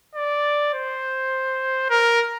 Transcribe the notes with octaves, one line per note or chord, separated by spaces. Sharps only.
D5
C5
A#4